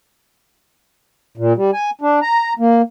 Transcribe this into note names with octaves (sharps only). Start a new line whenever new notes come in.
A#2
G3
G#5
D4
A#5
A#3